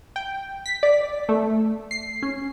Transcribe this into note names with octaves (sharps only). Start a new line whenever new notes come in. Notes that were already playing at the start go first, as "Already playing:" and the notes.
G5
B6
D5
A3
C7
C#4